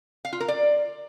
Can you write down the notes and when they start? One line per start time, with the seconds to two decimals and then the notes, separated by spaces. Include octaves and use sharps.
0.25 F5
0.33 F4
0.40 A#4
0.48 D5